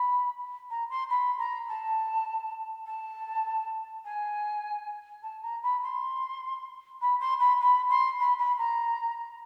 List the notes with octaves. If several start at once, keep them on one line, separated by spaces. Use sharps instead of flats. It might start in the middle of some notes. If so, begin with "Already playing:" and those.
Already playing: B5
A#5
C6
B5
A#5
A5
A5
G#5
A5
A#5
B5
C6
B5
C6
B5
B5
C6
B5
B5
A#5